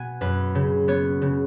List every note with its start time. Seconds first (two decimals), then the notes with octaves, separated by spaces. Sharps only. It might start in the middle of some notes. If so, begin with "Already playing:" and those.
Already playing: B2 B3 F#5 G#5
0.21 F#2 B4
0.55 C#3
0.88 B3 C#5
1.22 C#3